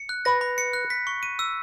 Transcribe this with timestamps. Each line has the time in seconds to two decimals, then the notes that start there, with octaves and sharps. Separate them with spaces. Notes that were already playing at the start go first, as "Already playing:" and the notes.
Already playing: C#7
0.09 F#6
0.25 B4 A#6
0.41 B5
0.58 C#7
0.73 F#6
0.90 B6
1.07 C#6
1.23 D#7
1.39 E6